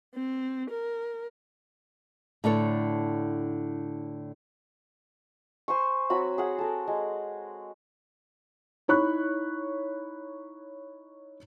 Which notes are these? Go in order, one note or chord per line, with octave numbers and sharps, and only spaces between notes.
C4
A#4
A2 D3 A4 C#5
C5 G#5 C#6
F#3 C4 F#4 B5
G#4 F#5
A4 A#4
G#3
D#4 E4 C#5 B5 C#6 F#6